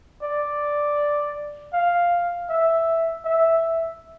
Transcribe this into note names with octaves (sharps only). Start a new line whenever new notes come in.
D5
F5
E5
E5